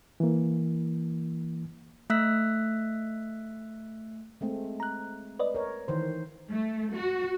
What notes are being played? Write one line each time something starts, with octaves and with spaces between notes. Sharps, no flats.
E3 A#3
A3 E5 E6 F#6 B6
G#3 A3 C4
A#5 F#6
B4 D5 D#5
A#4 C#5
D#3 E3 C5
A3
F#4